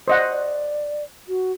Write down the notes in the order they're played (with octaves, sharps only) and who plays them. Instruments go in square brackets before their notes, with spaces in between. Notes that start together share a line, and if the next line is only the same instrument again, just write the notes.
[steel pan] C5 D#5 F#5 [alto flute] D5
[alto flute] D5
F#4